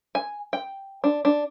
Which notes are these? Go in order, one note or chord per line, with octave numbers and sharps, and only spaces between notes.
G#5
G5
D4
D4